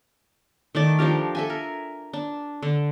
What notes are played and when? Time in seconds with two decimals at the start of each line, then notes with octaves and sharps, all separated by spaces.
0.75 D#3 A3 D5
0.99 F3 D4 G4 A#4
1.35 A4 E5 G#5
1.50 A#4
2.13 D4
2.62 D3